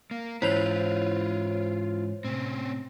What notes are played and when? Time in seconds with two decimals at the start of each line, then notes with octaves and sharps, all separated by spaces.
0.11 A#3
0.42 G#2 E3 C#4 E4 F4 C5 C#5 F7
2.25 A2 C3 C4 C#4